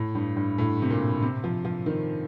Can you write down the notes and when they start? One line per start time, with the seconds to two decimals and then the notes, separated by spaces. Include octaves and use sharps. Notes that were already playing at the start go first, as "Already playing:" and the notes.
Already playing: A2
0.15 G2
0.36 G2
0.58 A2
0.82 C3
0.90 A#2
1.22 C3
1.44 F3
1.65 F3
1.86 D#3